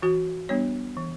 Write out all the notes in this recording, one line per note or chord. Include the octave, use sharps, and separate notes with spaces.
E3 F#4
G3 B3 D4 C#5
E3